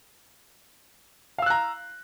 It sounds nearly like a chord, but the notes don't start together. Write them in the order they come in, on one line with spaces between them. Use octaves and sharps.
F5 E6 F#6 A#5